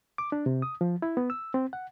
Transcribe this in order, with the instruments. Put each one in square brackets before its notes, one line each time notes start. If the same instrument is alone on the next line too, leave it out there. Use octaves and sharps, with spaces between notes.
[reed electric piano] D6
D4
C3
D#6
F3
E4
B3
E6
C4
F#5